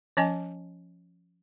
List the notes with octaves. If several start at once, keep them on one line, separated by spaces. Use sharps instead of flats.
F3 C#4 D#5 G#5